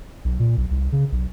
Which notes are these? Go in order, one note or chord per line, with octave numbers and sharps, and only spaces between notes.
B1
A#2
B1
C2
C#3
B1